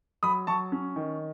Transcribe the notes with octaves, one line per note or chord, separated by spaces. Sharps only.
F#3 B5 D#6
F#3 A5 C#6
C#4
D#3